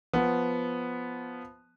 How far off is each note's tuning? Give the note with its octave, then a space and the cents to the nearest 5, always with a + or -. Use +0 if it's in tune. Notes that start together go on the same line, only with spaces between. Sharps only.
F3 +0 B3 +0